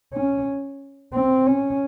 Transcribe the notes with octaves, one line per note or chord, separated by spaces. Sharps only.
C#4
C4
C#4